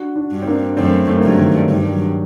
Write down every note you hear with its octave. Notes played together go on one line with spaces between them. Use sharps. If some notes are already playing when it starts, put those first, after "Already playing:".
Already playing: D4 F#4
D4 F#4
G2
C4
A#3 D4
F#2 A3 C4
A3
A#3
G2 F#3 A3
D#3 G3
G2 D#3
F#3